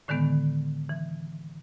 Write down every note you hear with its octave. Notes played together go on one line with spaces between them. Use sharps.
A2 D3 D#3 G#3 B3
E3